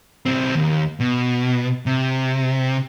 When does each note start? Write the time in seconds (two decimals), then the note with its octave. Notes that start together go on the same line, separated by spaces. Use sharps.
0.26 B1 C4
0.54 D#2
1.00 B2
1.86 C3